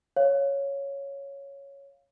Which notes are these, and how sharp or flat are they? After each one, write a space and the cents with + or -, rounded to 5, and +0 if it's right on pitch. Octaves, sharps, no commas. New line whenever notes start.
C#5 +0 F5 +0